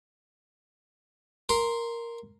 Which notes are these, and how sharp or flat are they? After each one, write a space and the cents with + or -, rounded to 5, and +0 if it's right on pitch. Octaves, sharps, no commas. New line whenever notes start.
A#4 +0 C6 +0